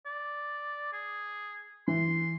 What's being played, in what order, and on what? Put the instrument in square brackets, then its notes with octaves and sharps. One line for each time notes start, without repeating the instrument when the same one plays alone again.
[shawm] D5
G#4
[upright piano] E3 [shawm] C6